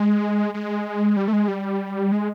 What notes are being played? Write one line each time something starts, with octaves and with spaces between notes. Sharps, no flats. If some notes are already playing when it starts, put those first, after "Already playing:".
Already playing: G#3
G#3
G3
A3
G#3
G3
G#3